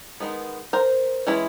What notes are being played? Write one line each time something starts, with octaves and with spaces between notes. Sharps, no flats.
D#3 G#3 B3
A#4 C5
E3 G#3 C#4 E4